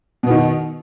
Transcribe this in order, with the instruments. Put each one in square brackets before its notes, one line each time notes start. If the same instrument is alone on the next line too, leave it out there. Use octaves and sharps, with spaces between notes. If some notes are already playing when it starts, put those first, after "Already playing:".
[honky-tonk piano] B2
B3
D#3